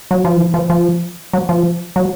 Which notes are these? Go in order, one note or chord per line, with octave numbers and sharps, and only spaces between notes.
F#3
F3
E3
F3
F3
F#3
F3
F#3